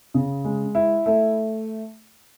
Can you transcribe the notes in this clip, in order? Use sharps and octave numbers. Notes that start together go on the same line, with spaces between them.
C#3
G#3
E4
A3